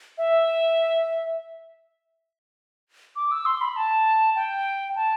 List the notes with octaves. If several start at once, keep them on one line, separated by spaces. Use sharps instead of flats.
E5
D6
E6
C6
B5
A5
G5
A5